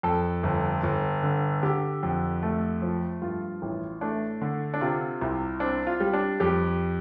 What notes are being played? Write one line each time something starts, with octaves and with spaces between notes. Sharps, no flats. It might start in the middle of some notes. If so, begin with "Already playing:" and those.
F2 A4
G1
G1
D3
D3 G4
F2
A3
F3
G2 F4
A1
A3 D4
D3
D4
C3 F4
C2
C4 D4
F4
G3
D4
F2 G4